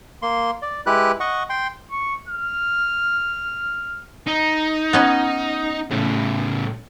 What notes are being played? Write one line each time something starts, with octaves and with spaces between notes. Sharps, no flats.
A#3 C6
D5
G#3 E4 G4 B4 F#6
D#5 F#5 C#6
G5 C6
C#6
F6
D#4
B3 C#4 D#5
A2 C#3